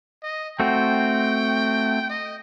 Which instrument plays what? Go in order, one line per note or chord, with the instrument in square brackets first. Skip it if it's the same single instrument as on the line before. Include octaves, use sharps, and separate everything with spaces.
[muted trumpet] D#5
[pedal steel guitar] A3 C4 F#4 [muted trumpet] G5
[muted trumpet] D#5